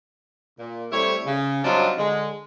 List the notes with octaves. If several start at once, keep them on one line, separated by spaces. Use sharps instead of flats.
A#2
G3 A3 C4 E4 C#5
C#3
F#3 G3 C4 D4 D#4 F4
D3 G#3